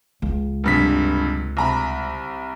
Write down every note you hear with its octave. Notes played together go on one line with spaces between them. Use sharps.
C#2
F1 G2 B6
C2 A#5 B5